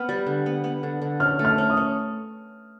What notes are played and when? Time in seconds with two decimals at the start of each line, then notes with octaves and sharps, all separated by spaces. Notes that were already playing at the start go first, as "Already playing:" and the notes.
Already playing: B3 F6
0.09 G3
0.26 D3
0.46 B3
0.64 B3
0.83 D3
1.02 D3
1.20 C#4 F6
1.39 A3
1.45 F6
1.58 C#4
1.70 D#6
1.77 C#4